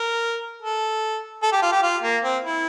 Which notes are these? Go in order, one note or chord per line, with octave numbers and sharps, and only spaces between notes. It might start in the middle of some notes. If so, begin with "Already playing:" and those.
Already playing: A#4
A4
A4
G4
F4
G4
F4
A#3
C4
E4